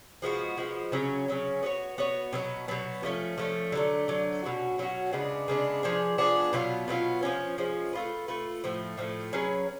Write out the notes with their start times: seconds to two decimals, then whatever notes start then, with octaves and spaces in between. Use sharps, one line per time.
0.22 F3 G#3 B3 F#4
0.57 F3 G#3 B3 F#4
0.92 C#3 F#3 C#4
1.28 C#3 F#3 C#4
1.63 B3 F#4 C#5
1.98 B3 F#4 C#5
2.33 B2 F#3 B3
2.68 B2 F#3 B3
3.03 F3 A3 C#4
3.38 F3 A3 C#4
3.72 D3 F#3 A3
4.08 D3 F#3 A3
4.43 B2 F#3 C#4 F#4
4.78 B2 F#3 C#4 F#4
5.13 C#3 G#3 B3 D4
5.48 C#3 G#3 B3 D4
5.83 F3 B3 D4 G#4
6.18 F3 B3 D4 G#4
6.53 B2 F#3 B3 F4
6.88 B2 F#3 B3 F4
7.23 F3 G#3 C#4
7.58 F3 G#3 C#4
7.93 A3 F4 B4
8.28 A3 F4 B4
8.64 A2 F3 A3
8.97 A2 F3 A3
9.33 F#3 C#4 G#4 B4